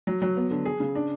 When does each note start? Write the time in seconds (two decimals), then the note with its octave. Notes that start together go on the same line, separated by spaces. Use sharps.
0.07 F#3
0.22 F#3
0.37 B3
0.51 D3
0.65 G#4
0.80 C#3
0.95 D4